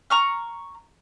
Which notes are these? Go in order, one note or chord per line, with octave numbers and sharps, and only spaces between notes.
A#5 C#6 F6